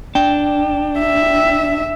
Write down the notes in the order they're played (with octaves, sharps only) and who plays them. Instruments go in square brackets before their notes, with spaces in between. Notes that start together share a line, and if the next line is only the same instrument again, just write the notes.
[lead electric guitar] D4 [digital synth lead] G5
[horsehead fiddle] E5